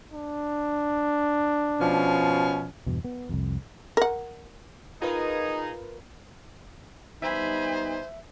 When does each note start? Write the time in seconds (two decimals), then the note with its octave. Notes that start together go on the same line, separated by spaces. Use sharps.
0.13 D4
1.79 B2 F3 C#4
2.87 E2 G2 B2
3.05 B3
3.29 C2 F2
3.97 A#4 F#5
5.02 D#4 F4 G#4 A#4 B4
7.22 G3 B3 D#4 C5 E5 G#5 B5